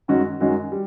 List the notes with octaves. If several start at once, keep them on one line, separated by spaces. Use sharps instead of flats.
F#2 D#3 G#3 C#4 F#4
F#2 D#3 G#3 C#4 F#4
G3